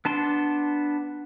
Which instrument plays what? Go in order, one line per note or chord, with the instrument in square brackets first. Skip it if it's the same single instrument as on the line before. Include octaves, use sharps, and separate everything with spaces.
[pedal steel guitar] B3 D4 A5 C6